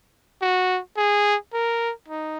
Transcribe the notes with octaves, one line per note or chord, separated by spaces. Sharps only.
F#4
G#4
A#4
D#4